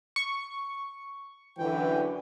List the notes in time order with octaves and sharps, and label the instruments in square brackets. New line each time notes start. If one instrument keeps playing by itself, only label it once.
[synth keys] C#6
[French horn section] F#2 D3 E3 [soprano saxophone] G5